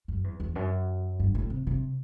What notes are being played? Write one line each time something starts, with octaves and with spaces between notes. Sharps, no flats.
F#2
E2
E2
F#2
G2
A2
C3
C3